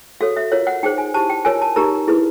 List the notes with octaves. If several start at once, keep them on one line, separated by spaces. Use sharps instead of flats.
F#4 A4 C#5 F5
E5
F4 A#4 C#5 F5
F#5
D#4 G#4 C5 G5
G#5
E4 G4 C5 A5
G5
F4 A#4 C#5 G#5
A5
D#4 G4 A#4 A#5
E4 G#4 B4